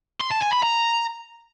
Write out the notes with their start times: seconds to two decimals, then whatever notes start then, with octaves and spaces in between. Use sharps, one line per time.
0.20 C6
0.31 A5
0.41 G#5
0.52 B5
0.62 A#5